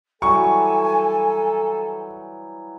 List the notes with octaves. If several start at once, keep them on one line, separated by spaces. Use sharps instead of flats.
E3 F#3 G3 A4 G#5 C#6